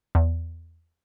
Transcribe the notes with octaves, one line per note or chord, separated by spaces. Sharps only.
E2